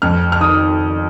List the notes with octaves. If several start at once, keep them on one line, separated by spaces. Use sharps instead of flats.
F2 F6
F6
D#3 D#6